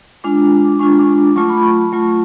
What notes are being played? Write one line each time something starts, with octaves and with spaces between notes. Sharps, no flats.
G#3 D4 F4 D6
G#3 D4 F4 C#6
D6
D6
F#3 A3 F4 C#6
B5
C#6
F#3 A3 F4